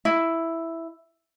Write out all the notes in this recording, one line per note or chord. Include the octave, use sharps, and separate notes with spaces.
E4